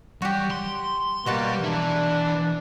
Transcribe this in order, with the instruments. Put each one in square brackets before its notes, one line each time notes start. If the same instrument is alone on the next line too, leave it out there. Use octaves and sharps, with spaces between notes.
[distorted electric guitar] G3 [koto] F#4 G4
[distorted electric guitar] C6
[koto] B2 F#4 A5 [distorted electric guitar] G3 [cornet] A#3
[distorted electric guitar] E3 E4 [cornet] D4